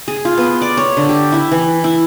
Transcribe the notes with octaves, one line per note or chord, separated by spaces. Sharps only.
G#4
F4
B3
D5
C#5
D3
G4
E4
E3
E4